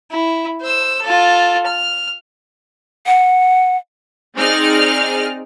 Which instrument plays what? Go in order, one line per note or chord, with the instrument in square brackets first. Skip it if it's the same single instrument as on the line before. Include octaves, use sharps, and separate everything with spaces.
[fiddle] E4
C5 E6
F4 A4
F6
[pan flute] F#5
[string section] C4 D#4 G#4 D5 F6